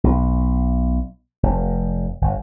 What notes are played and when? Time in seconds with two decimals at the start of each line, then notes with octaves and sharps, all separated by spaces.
0.04 B1
1.43 F1
2.21 G1